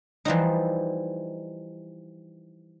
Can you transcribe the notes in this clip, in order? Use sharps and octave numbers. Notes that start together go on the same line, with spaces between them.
E3 F3 G3 D#4